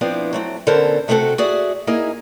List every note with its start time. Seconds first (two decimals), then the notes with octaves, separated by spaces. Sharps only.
0.01 F3 B3 C4 D4 E4
0.33 F#3 A3 C4
0.67 D3 B3 C#4 A4 A#4 C5
1.08 C3 A3 C4 D4 F#4 A4
1.38 F#4 G#4 D5 E5
1.87 A#3 D#4 E4 G#4